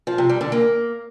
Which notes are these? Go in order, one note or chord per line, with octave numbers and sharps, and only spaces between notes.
F3
C3
G3
D3
A#3